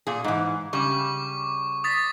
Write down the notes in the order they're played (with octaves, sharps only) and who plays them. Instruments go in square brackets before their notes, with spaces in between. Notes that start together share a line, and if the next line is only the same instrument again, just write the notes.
[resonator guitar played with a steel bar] A#2 G#4
G#2 E3
[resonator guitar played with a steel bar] C#3 G3 [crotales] C#6 D6
[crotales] D#6 A6 B6